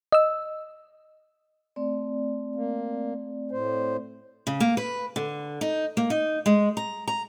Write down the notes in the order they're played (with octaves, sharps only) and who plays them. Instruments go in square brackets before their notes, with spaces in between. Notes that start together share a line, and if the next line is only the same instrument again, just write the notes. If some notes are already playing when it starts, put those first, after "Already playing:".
[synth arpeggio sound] D#5 E6
[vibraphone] A3 C4 D5
[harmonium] A#3
A2 C5
[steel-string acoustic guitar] C#3
A#3
B4
D3
D#4
A#3
D#4
G#3
A#5
A#5